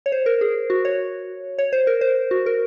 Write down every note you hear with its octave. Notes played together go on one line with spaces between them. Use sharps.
C#5
C5
A#4
G#4
F#4
C#5
C#5
C5
A#4
C5
F#4
A#4